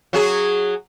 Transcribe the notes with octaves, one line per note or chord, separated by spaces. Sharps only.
F#3 F#4 G#4